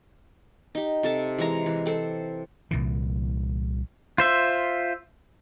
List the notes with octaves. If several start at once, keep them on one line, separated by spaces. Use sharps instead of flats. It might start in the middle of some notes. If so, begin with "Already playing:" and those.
D#4 G4
C3 A4 A5
E3 G#3 A#5
E3
C4 A4 C5
C2 A#2 E3
F4 C5 E5